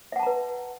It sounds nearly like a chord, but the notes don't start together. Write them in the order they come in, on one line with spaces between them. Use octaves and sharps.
E5 F#5 A5 A#5 B4